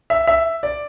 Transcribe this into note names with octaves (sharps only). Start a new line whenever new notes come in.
E5
E5
D5